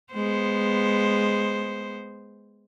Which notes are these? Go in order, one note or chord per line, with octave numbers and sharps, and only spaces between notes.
G#3 B3 C5